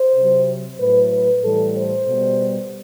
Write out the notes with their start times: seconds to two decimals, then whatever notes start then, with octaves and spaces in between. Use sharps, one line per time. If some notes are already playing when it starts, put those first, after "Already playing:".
Already playing: C5
0.15 C3 F#3
0.80 A2 F#3 B4
1.11 B4
1.43 A2 E3 G3 A4
1.76 C5
2.07 B2 G3